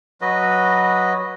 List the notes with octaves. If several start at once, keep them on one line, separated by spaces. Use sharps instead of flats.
F#3 F#4 B4 D#5